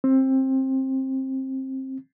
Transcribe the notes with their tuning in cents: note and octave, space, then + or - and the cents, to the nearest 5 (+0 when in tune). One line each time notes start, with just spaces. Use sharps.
C4 +20